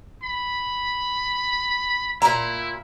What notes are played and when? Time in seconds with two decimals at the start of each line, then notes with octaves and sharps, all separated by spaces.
0.23 B5
2.22 A#2 E4 A#5